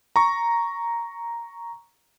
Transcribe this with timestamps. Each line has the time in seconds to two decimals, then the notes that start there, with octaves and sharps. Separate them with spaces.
0.16 A#5 C#6